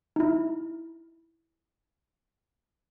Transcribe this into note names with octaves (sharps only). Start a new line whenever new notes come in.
D#4 E4